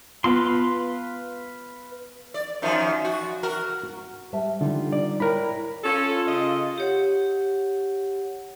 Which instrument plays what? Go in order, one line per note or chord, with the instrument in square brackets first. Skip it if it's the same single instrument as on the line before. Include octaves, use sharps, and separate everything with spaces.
[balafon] B3 F4 [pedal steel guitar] B4 F5 C6
[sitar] D5
F#2 D#3 F3
F#4
F#4 A#4
[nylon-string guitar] F#4
G3 E5 A5
[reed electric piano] D3 [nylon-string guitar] G3 D#4 F4
[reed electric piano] D5
[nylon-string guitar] E4 C#5 G5 [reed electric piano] A#4 B5
[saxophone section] C#4 A4 [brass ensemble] F4
[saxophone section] C#3 D#5
[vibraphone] G4 C#5 F#5